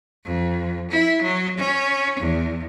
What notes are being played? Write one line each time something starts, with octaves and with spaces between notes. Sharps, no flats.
F2
E4
F#3
C#4
E2